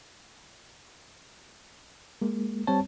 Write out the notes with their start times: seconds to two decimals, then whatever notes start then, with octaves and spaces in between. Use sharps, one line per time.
2.21 G#3 A#3
2.67 G3 C4 C#5 A5